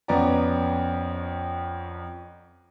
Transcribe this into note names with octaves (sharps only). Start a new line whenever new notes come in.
F2 B3 C#4 D5 A#5